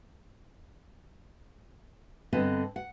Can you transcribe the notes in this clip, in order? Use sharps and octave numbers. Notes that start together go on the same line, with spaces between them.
G2 D3 B3 C4 B4 D#5
F#5